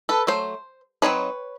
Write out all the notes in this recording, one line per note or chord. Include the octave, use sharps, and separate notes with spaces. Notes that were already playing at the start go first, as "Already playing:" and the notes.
A4 B4
F#3 A3 C5
F#3 A3 C4 D#4 B4 C#5